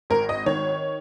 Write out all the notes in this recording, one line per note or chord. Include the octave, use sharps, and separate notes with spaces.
G#1 A#4
D#5
D#3 C#5